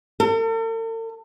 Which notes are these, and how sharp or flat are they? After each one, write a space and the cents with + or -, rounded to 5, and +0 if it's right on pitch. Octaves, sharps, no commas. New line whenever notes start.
A4 +45